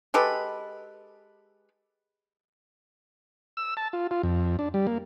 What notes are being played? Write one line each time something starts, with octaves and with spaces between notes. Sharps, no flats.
G#3 G4 A4 B4
E6
A5
F4
F4
F2
D4
G3
A#3